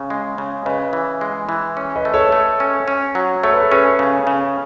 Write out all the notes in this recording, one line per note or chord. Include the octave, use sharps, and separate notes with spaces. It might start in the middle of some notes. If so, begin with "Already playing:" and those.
Already playing: C#3
G#3
C#3
C#3 B4 D#5
E3
G#3
E3
C#4
B4 D#5
A3
A4 C#5
A3
C#4
C#4
F#3
A3 C#5
B4
A4
C#4 G#4 B4
C#3
C#3